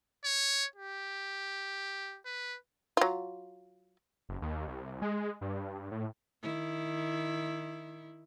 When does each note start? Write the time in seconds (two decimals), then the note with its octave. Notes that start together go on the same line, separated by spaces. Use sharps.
0.25 C#5
0.76 G4
2.26 B4
2.97 F#3 F4
4.29 F#1
4.42 D#2
4.68 C2
5.02 G#3
5.41 G2
5.91 A2
6.43 D#3 E4